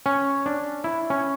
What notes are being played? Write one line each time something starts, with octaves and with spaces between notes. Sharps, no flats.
C#4
D4
E4
C#4